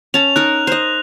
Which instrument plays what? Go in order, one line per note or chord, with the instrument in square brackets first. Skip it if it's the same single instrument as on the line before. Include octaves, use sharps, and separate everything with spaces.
[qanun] C#4 A5 [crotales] F7
[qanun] D#4 A#4 [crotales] F#6
[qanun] C5 D#5